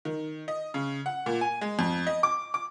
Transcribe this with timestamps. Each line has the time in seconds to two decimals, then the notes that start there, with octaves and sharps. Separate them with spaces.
0.05 D#3
0.48 D#5
0.74 C#3
1.06 F#5
1.26 A#2
1.41 G#5
1.61 G#3
1.79 F2
2.07 D#5
2.23 D6
2.54 D6